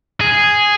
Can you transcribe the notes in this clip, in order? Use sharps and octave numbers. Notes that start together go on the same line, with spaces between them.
G#4